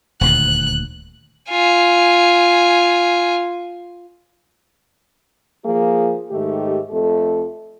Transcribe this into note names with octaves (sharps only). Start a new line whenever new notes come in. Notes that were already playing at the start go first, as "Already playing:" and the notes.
D#1 D2 A#2 F#6
F4 G#5
F3 A#3 G#4
G#2 D#3 A3 G4
F2 A3 A4